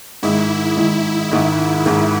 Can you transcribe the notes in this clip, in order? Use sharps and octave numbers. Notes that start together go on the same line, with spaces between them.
G#2 D#3 G#3 E4
G#2 D#3 G#3
G#2 D#3 G#3
G#2 D#3 G#3 E4